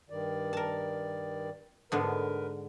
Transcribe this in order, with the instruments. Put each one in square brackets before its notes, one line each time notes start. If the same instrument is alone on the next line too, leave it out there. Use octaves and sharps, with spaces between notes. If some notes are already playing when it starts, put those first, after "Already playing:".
[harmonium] G2 D#3 D5
[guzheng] A#4 A5
[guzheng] G#2 D3 B3 [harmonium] A#4 B4